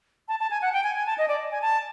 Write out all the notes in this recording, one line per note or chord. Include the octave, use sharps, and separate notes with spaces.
A5
A5
G#5
F#5
G5
G#5
G#5
A5
D#5
D5
G#5
A5